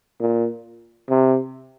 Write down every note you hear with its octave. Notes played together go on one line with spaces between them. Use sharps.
A#2
C3